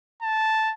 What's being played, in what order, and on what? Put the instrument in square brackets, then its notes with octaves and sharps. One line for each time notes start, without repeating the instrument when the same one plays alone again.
[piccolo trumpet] A5